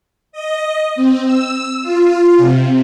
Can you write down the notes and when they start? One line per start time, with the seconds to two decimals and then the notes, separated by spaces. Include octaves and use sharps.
0.32 D#5
0.96 C4
1.25 E6
1.82 F4
2.38 C3